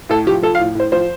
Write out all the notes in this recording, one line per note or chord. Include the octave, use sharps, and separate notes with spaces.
A2 A4
F3 G4
F3 A4
F5
A2
A2 C5
F3 C5